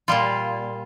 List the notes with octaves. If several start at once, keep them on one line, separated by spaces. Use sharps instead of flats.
A#2 G3 F4